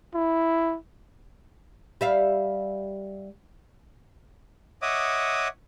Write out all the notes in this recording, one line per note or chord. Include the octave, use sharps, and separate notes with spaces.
E4
G3 E5 F5
C#5 D#5 E5 F#5 D6 D#6